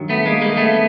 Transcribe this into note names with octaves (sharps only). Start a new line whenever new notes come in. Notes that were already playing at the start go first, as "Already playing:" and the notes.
Already playing: G2 D#3 F#3
A3 B3
G#3 A#3
G#3 A#3
A3 B3